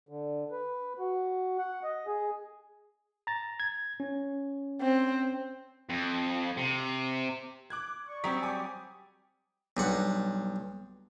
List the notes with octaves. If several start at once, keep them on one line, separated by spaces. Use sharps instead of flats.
D3
B4
F#4
F#5
D#5
G#4
A#5 A6
G#6
C#4
C4
F2
C3
D6 F#6 G#6
D5 C#6
F#3 G3 C4 D#6 B6
G#5 D6 D#6
B1 G2 F#5